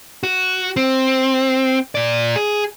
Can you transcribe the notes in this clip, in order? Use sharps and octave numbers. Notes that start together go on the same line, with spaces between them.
F#4
C4
A#2 D5
G#4